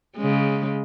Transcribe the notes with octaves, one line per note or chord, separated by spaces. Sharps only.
C#3 G#3